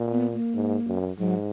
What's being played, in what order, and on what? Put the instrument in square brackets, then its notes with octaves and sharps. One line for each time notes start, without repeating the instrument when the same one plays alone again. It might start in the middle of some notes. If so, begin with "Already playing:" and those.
Already playing: [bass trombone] A#2
[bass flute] B3
A#3
[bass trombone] G#2
F#2
[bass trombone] G#2 [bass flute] F#3